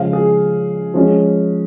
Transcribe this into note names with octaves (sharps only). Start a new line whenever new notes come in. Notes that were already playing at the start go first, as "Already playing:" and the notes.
Already playing: C#3 F3 G#3 F5
G#4
F3 G#3 C#4